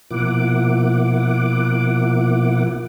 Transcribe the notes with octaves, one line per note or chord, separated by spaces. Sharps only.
B2 F3 A#3 E4 F#5 D6